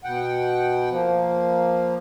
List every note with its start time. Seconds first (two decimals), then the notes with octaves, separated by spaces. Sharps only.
0.04 B2 F#5 G5
0.91 F3 A#3